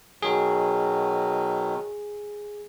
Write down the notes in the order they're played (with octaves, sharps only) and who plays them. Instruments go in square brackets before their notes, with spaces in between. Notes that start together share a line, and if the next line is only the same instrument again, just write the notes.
[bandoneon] B2 D#3 F#3 [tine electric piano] G#4